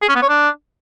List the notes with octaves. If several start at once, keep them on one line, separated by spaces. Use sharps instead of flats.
G#4
C#4
B3
C#5
D4